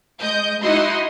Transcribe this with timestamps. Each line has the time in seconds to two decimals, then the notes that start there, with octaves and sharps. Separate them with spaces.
0.20 G#3 D#5 G6
0.62 D#4 E4 F#4 D#5 E5 C6